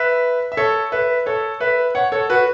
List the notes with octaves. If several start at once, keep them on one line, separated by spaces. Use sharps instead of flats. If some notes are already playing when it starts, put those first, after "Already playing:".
Already playing: B4 E5
E5
A4 C#5
B4 E5
A4 C#5
B4 E5
C#5 F#5
A4 C#5
F#4 B4